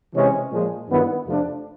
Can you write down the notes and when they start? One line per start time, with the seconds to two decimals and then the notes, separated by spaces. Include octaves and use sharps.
0.14 C3 E3 G#3 C#4
0.51 A#2 F3 G#3
0.88 G2 D#3 F#3 B3 E4
1.26 F2 C3 F3 A3 D4